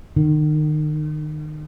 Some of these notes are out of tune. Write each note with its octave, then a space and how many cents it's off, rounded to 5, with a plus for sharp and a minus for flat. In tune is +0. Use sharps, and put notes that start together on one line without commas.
D#3 -35